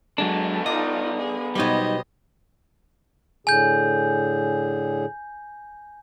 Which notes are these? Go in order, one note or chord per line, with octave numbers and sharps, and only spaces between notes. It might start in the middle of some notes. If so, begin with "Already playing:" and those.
F#3 G#3 B3 D4 A4
D#4 F4 D5 D#5
G#4
B2 F#3 G3 D#4 G4 C5 D#5
A2 D3 G#4 G#5 G6